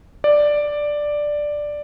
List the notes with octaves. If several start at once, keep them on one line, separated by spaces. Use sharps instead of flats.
D5